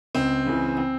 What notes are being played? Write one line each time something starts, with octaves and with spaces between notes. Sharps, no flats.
C#2 C4
C#3 E3
C4